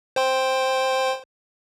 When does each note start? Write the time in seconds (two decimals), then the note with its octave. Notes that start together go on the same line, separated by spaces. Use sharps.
0.16 C5 G5 C6